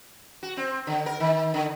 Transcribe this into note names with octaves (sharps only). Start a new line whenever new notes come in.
F#4
C4
D3
A#4
D#3
D3